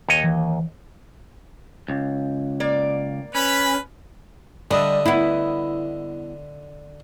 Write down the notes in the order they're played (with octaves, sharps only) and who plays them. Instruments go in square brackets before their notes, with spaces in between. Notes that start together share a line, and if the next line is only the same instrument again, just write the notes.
[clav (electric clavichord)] D#2 C#5 D#5
[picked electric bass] E3
[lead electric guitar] C#2
[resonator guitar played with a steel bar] A#3 D5
[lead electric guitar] C#4 [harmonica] B4 B5
[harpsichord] D3 D#5 E5 [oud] G3 D4
[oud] B3 E4